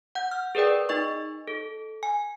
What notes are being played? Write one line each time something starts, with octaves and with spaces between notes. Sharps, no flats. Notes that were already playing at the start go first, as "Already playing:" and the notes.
F#5 G6
F6
G#4 A#4 B4 D5 G5
D#4 D#5 C#6
A4
G#5